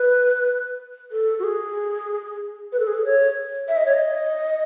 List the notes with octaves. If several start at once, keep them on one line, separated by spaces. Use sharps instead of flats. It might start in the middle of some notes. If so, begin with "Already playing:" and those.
Already playing: B4
A4
F#4
G#4
B4
A4
G#4
A4
C#5
E5
D#5
C#5
D#5